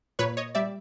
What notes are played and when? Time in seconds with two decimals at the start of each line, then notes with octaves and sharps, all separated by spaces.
0.19 A#2 B4 C#5
0.37 C#5 D#5
0.55 G3 D5 E5